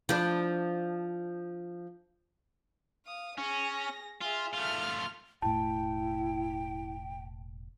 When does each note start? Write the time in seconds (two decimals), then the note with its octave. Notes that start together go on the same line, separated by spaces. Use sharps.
0.09 F3 D4
3.06 F5 D#6
3.38 C#4 G#4 A#6
4.22 F4 G#4 E5
4.54 A3 F4 F6
5.42 E1 A2 A3 E4 G5 A5